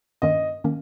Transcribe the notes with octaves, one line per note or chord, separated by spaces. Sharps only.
G2 D#3 A#3 C#4 D#5
D#3 A#3 C#4